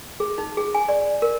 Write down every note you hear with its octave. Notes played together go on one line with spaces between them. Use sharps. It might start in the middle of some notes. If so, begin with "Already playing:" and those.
G#4
D#4
G#4
G#5
D5
A#4